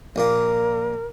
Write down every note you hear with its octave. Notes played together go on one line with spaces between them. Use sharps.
A#1 A#2 A#3 A#4